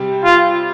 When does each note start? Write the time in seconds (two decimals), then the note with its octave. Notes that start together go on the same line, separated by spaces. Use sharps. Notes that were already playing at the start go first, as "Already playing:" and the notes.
Already playing: C3 G3 C4
0.24 F4